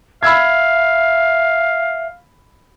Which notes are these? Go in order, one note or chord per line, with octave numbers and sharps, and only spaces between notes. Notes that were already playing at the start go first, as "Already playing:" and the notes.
E5 F5 B5 E6 G#6